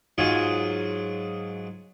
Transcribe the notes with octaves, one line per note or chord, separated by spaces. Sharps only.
G#2 F#3 F4 G#4